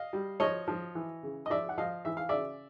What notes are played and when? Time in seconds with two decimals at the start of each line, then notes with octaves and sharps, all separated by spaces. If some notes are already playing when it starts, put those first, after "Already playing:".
Already playing: D#5 F5
0.13 G3
0.40 F3 C#5 D#5
0.68 F3
0.95 E3
1.23 C#3
1.46 D#5
1.50 F3 D5 E5
1.69 F#5
1.78 F3 D#5 F5
2.05 E3 E5
2.17 F5
2.29 C#3 D5 E5